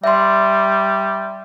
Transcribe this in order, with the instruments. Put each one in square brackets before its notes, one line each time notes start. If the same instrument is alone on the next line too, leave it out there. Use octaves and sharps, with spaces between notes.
[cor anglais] G3 [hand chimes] E5 C6